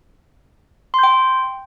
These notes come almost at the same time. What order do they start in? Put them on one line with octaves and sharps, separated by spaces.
C6 G6 G5